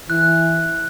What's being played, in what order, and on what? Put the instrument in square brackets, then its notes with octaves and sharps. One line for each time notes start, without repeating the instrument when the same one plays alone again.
[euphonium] E3 [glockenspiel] F#6